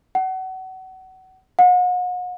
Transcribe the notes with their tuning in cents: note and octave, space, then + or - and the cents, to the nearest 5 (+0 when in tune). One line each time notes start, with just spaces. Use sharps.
F#5 +30
F#5 -40